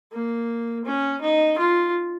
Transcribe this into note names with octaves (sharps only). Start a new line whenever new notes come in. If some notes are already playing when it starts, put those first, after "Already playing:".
A#3
C#4
D#4
F4